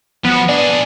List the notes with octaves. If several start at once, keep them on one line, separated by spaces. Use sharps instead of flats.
F3 B3 F#4
D4 G#4 D5